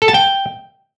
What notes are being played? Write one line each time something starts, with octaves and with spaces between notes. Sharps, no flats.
A4
A5
G5